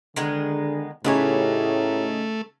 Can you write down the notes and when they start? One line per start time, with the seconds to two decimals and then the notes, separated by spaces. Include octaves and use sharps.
0.16 D3 D#3 G#3 B3
1.05 A2 C#3 A3 B3 D#4 G4 G#4 C#5